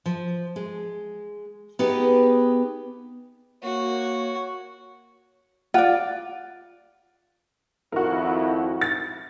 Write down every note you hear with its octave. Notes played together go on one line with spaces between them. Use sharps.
F3
G#3
B3 D#4 G4 G#4 B4
A#3 F#4 C#5
F4 D5 F#5
G#1 F2 E4 F#4 A#4
A6